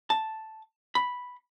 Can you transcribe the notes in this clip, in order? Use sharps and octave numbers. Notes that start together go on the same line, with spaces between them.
A5
B5